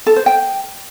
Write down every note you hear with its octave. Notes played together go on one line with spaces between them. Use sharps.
A4
C5
G5